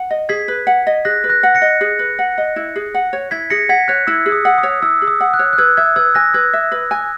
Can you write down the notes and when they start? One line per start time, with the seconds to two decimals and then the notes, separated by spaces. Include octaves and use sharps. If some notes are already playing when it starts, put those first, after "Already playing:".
Already playing: F#5
0.11 D#5
0.29 G#4 G#6 B6
0.48 B4
0.67 F#5
0.87 D#5
1.05 G#4 F#6 A#6
1.24 B4
1.30 F#6 A#6
1.43 F#5
1.55 A#6 C#7
1.62 D#5
1.81 G#4
1.99 B4
2.19 F#5
2.38 D#5
2.56 E4
2.76 G#4
2.94 F#5
3.13 C#5
3.31 E4 G#6 B6
3.50 G#4 A#6 C#7
3.69 F#5 G#6 B6
3.88 C#5 F#6
4.07 E4 E6
4.26 G#4
4.32 D#6
4.45 F#5
4.58 D#6
4.63 C#5
4.82 E4 E6
5.02 G#4
5.07 D#6
5.21 F#5
5.34 F#6
5.39 C#5
5.53 F#6
5.58 B4 E6 G#6
5.77 E5 E6 G#6
5.96 B4 E6 G#6
6.14 G#5 F#6 A#6
6.34 B4 E6 G#6
6.53 E5
6.72 B4
6.91 G#5